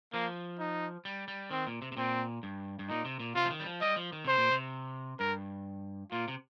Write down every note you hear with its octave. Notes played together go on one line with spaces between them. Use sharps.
F3 A#3
D#4
G3
G3
D#3 C4
A#2
C3
C3
A#2 C4
G2
G2
A#2 D#4
C3
A#2
C3 F4
F3
D#3
G3
F3
G3 D#5
F3
D#3
C3 C5
A#2
C3
G2 A#4
A#2 F4
C3